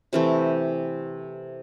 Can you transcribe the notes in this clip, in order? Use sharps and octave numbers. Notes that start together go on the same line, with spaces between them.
C3 E3 A3